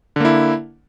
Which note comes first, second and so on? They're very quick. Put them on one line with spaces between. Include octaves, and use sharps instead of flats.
D3 A#3 E4